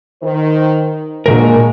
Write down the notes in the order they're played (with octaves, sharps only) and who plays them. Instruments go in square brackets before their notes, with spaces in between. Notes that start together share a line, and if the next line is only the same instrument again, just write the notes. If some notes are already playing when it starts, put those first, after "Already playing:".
[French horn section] D#3 C5
[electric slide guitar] A#2 C#3 A#4 [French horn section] G#3 D4 F#4